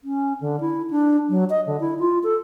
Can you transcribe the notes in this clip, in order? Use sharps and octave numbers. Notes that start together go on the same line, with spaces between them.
C#4
D3
E4
D4
F#3
D#5
D3
E4
F4
A4